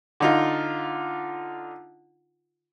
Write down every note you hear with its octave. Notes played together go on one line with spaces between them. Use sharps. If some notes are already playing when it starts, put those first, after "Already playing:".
D3 D#4 F4